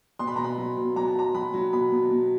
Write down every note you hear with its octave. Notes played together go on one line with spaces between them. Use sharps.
B2 C6
B5
B2 A#5
B5
F#3
B2
F#3 A#5
A5
F#3 A#5
F#3 B5
F#3
B2 B5
B2
B2